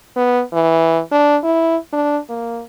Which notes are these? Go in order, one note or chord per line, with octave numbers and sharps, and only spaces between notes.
B3
E3
D4
E4
D4
A#3